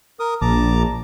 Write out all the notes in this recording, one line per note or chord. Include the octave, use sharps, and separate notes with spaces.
A#4 D#6
A#1 A5 A#5 D6